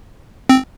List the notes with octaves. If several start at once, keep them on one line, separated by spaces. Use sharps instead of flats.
C4